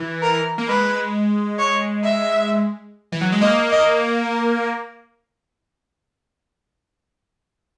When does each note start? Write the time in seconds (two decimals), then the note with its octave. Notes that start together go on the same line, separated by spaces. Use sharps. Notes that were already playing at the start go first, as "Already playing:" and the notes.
Already playing: E3
0.23 A#4
0.58 A#3
0.68 G#3 B4
1.59 C#5
2.04 E5
3.12 E3
3.21 F#3
3.32 G#3
3.41 A#3 D#5
3.71 D#5